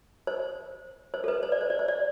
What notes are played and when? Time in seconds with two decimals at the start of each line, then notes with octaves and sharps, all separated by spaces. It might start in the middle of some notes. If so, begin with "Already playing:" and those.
0.27 C5
1.14 C5
1.24 A4
1.28 B4
1.43 C5
1.52 D5
1.61 C5
1.70 D5
1.79 C5
1.88 D5